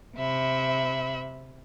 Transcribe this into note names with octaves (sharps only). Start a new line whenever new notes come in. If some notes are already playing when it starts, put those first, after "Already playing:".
C3 E5 B5